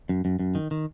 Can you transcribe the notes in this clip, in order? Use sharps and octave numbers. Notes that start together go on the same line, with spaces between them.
F#2
F#2
F#2
D#3
D#3